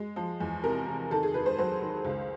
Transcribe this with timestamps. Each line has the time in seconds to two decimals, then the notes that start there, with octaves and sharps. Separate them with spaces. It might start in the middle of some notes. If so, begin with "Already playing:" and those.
Already playing: G#3
0.16 F3
0.40 E2
0.63 C3 A#4
0.87 C3
1.11 D#3 A4
1.23 G#4
1.34 D#3 B4
1.46 C5
1.58 F#3 C5
1.81 D#3
2.05 C#2